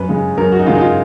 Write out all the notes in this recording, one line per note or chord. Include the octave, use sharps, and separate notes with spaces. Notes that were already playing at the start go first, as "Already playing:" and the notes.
Already playing: F#2 B4
C#3 G#3
F#2 A#4
F#4
D#4
C#3 G#3 F4
D#4
F4